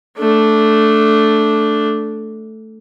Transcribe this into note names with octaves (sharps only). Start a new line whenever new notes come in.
A3 D4